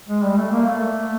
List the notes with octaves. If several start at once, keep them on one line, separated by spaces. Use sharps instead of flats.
G#3
G3
A3
A#3
A3